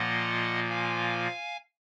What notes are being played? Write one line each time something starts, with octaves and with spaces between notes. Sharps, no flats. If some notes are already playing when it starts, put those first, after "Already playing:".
Already playing: A#2 F3 A#3 F4 D#5 F#5
F5 G#5